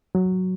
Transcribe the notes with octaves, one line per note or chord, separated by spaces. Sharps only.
F#3